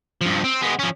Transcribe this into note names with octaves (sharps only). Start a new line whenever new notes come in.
G2 F3
C4
G#3 B3
F3 C#4